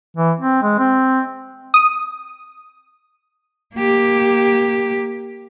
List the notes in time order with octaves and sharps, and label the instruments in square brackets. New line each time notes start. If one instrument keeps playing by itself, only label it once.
[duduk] E3
C4
G#3
C4
[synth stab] D#6
[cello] A#3 G4